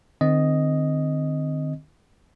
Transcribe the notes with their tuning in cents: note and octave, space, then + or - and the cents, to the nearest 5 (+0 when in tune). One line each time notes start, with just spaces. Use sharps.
D#3 -40 C4 -10 D#5 +0